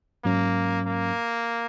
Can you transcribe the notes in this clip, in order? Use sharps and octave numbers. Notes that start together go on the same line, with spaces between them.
G#2 F#3 A#3 C#4
A#3